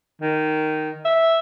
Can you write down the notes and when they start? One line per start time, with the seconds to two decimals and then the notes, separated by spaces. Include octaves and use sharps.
0.21 D#3
1.05 E5